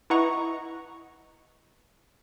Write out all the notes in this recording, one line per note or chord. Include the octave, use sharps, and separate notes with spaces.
E4 B4 D#5 F#5 A#5 C#6